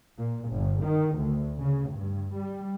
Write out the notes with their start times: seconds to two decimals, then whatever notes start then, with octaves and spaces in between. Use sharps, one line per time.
0.17 A#2
0.50 G1
0.83 D#3
1.17 D2
1.59 C#3
1.91 G2
2.35 G3